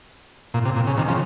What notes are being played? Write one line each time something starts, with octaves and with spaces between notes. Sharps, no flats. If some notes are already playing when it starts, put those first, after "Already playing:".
A#2
C3
A#2
C#3
C3 D#3
C#3 F3